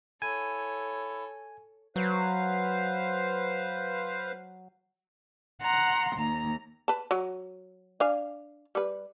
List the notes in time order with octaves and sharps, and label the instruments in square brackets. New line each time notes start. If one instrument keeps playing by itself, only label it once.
[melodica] E4 [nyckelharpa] A4 C#5 [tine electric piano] G#5
[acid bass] F#3 [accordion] B4 C5 F5
[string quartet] F#5 A#5 C6
D#2 A#5
[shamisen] B4 A5
F#3
D4 F5 G#5
G3 B4